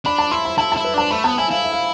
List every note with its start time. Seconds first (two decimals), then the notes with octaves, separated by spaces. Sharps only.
0.05 D4 B5
0.18 A5
0.31 E4 C6
0.45 B5
0.58 E4 A5
0.72 E4 A5
0.85 B4
0.94 D4 A5
1.11 A3 B5
1.24 B3 A5
1.37 E4 G#5
1.50 E4 F5
1.64 E5
1.72 F5